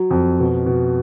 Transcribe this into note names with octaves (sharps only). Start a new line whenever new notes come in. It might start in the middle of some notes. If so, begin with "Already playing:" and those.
Already playing: F#3
F2
B2
B2